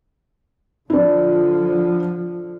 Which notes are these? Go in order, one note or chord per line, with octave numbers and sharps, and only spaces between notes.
D3 F3 D4 E4